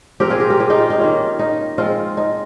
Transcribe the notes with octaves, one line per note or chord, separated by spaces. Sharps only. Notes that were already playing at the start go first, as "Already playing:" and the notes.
F3 C4 G4 A#4
F4 G#4
G4 A#4
G4 A#4
F4 G#4
D#4 G4
F4
D#4
D#3 A#3 C#4 F4
D#4
F3 G#3 C4 F4
D#4